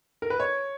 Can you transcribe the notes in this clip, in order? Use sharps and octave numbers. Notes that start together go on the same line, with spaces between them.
A#4
B4
C#5